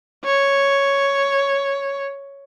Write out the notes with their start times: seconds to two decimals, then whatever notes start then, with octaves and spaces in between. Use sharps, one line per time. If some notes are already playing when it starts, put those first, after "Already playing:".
0.25 C#5